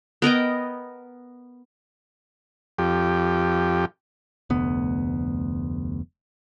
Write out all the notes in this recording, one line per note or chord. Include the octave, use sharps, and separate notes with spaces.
B3 A#4 D#5 G5
F2 G4
F1 D2 B3